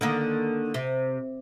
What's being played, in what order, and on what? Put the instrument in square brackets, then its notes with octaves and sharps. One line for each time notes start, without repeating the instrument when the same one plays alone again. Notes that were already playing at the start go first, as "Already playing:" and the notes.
[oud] D3 D#3 A#3
C3